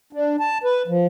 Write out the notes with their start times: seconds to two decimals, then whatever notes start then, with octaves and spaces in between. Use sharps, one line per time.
0.13 D4
0.40 A5
0.64 B4
0.88 F3